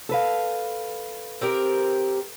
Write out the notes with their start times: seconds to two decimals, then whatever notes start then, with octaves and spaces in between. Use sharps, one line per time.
0.09 A4 B4 F5
1.41 C4 G4 A#4